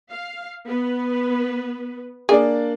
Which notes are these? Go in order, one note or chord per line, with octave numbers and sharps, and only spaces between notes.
F5
B3 B4
A#3 D4 G#4 D5